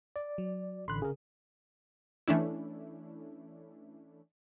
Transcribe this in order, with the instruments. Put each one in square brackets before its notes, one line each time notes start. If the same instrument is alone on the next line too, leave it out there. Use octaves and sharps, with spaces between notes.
[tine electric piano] D5
[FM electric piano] F#3
[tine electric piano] A1 D3 B5 [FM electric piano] C6 F#6
[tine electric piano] C#3 A#4 [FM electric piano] G#4
[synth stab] E3 A3 C#4 D4 E4